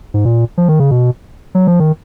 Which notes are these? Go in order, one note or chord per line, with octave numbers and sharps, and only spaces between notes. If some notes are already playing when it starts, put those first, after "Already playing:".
G#2
A#2
F3
D#3
C#3
B2
F#3
F3
D#3